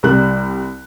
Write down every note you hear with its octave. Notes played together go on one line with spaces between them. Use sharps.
C2 G3 F#6